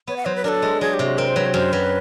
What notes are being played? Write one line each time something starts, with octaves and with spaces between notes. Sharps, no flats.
B3 C#5
F#5
F#3 C5
B4
D4 A4 A#4
G#3
F#3 G#4
G4
C3
F#4
C4 A#4
C5
F#3 B4
C#5
F#2 C5
F#3 B4